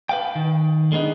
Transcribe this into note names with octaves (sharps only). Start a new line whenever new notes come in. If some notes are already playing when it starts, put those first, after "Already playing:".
B4 F5 G5
D#3
D3 G#3 B3 D#4